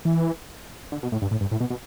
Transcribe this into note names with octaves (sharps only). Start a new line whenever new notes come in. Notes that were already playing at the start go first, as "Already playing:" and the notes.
E3
D3
B2
A2
G2
A2
G2
A2
B2
B2